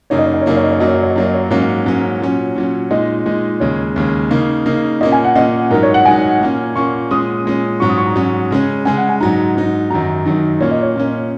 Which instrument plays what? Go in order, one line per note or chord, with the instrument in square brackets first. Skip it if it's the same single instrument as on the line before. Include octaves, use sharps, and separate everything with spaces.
[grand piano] F#2 C#3 A#3 D#4 [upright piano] C#5
[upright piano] D#5
C#5
D#5
C#5
[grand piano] F#2 C#3 A#3 D#4 [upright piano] D#5
[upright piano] C#5
D#5
C#5
[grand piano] F#2 F#3 A#3 [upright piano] D#5
[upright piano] C#5
D#5
C#5
D#5
[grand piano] F#2 F#3 A#3 [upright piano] C#5
[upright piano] D#5
C#5
[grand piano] G#2 F#3 A#3 C#4 [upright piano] C#5
[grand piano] G#2 F#3 A#3 C#4
A#2 F#3 C#4
A#2 F#3 C#4
[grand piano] A#2 G#3 D#4 [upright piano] D#5
[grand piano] A#2 G#3 D#4
[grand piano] D#2 C#3 G#3 [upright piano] C#5
[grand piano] D#2 C#3 G#3
C#3 A#3 D#4
C#3 A#3 D#4
[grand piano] A#2 A#3 C#4 [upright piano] D#5
[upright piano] G#5
F#5
[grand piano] A#2 A#3 C#4 [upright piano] D#5
[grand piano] G#2 F#3 D#4 [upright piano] A#4
[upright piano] C#5
F#5
[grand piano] G#2 F#3 D#4 [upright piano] G#5
[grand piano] A#2 A#3 C#4
[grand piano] A#2 A#3 C#4 [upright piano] C#6
[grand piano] A#2 G#3 C#4 [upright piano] D#6
[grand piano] A#2 G#3 C#4
[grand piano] G#2 F#3 C#4 [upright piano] C#6
[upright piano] D#6
C#6
A#5
[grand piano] G#2 F#3 C#4
C#3 G#3 C#4
[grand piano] C#3 G#3 C#4 [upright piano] G#5
[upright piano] F#5
G#5
[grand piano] G#2 F#3 D#4 [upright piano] A#5
[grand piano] G#2 F#3 D#4
[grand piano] F#2 D#3 F#3 D#4 [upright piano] A#5
[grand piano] F#2 D#3 F#3 D#4
[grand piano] A#2 A#3 C#4 [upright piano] C#5
[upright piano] D#5
C#5
[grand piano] A#2 A#3 C#4